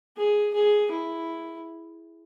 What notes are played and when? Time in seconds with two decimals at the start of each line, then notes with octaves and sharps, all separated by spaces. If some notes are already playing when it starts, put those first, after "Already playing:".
0.17 G#4
0.54 G#4
0.92 E4